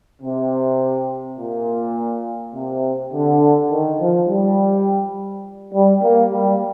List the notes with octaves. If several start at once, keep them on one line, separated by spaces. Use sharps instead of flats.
C3
A#2
C3
D3
D#3
F3
G3
G3
A#3
G3